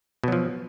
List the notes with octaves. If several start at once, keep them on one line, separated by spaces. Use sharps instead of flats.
B2 F3 F#3